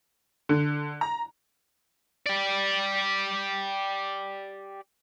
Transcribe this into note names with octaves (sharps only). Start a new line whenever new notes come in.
D3
A#5
G4 D5